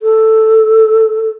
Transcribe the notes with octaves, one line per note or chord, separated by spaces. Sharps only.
A4